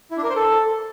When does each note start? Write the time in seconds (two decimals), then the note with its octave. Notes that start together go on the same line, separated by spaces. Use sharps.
0.11 E4
0.17 D4
0.23 A#4
0.29 C5
0.36 A4